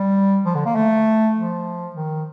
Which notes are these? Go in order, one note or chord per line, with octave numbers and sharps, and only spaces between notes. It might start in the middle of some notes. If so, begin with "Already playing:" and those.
Already playing: G3
F3
D3
A#3
A3
F3
D#3